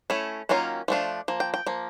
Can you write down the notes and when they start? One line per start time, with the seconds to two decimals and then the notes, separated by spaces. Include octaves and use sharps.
0.10 A3 C#4 E4
0.49 D#3 F#3 A#3 C#4 F4
0.88 F3 A3 D4 F4
1.28 F3 A#3
1.40 G5
1.54 G5
1.67 F3 A#3